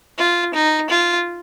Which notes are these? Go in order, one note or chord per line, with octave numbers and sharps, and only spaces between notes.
F4
D#4
F4